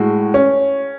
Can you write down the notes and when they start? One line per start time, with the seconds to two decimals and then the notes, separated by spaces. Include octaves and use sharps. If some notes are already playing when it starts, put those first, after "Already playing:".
Already playing: A2 G#3 F#4
0.34 C#4